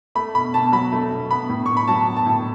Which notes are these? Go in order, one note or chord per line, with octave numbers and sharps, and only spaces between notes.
A3 B5
B2 B5
B2 A5
F#3 B5
A3
B2
B3 B5
A2
A2 C#6
B5
F#3 A5
B3
A5
A2